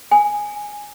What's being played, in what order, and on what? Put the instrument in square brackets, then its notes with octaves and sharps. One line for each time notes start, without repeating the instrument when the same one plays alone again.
[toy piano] G#5